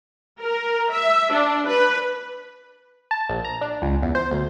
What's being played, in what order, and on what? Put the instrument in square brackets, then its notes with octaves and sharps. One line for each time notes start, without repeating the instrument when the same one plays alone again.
[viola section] A#4
E5
D4
B4
[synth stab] A5
A#1
A#5
D4
C#2
E2
C5
D2